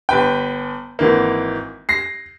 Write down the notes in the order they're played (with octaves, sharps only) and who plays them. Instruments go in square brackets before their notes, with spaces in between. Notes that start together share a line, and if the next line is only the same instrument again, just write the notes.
[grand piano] G1 B4 G5
G#1 E3 A#3
A#6 C7